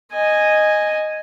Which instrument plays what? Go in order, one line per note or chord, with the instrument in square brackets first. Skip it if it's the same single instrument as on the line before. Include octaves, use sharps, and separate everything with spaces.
[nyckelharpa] D#5 G#5